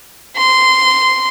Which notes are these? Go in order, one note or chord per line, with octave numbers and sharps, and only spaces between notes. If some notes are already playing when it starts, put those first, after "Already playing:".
C6